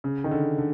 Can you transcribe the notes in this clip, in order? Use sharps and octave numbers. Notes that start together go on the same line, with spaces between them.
C#3
D#3
D3
D3